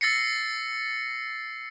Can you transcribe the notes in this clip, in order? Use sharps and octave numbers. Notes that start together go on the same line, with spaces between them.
E6 A6 A#6 C7 C#7